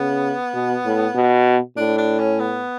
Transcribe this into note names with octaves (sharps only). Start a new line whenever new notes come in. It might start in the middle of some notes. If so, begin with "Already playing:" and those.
Already playing: C#3 B3
B2
A2
B2
A2 D4
D4
C#4
B3